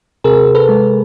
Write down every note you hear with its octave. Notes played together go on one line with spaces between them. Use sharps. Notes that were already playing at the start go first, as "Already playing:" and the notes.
C3 G#4 A#4
A4 B4
G#3